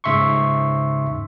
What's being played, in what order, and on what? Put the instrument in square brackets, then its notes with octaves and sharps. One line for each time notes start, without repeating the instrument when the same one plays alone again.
[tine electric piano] G#2 C#3 E5 C6 C#6